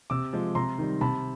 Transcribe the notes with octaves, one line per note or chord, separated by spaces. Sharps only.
C3 D6 E6
F3 G#3
C3 A#5 C6
D#3 G3
C3 A5 B5